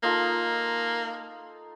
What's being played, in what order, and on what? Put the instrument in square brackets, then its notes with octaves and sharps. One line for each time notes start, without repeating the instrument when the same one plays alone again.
[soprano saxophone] A#3 [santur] D#4 F4 A4